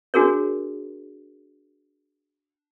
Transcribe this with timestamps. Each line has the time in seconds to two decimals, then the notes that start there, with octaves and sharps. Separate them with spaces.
0.14 D4 F#4 G#4 A#4 C#5